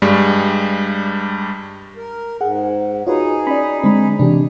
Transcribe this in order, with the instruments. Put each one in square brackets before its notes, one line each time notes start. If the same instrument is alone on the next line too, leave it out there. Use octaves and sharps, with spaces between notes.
[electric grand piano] G2 G3 G#3
[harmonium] A#4
[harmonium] G#2 [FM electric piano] G#4 [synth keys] F#5
[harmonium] D#4 G#4 [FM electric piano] F4 F#4 B4 [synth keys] C#5
[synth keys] C#4 D5 [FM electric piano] B5
[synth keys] D3 G#3 D4 [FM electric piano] C4 B5
[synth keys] C3 E3 G4 [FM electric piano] D4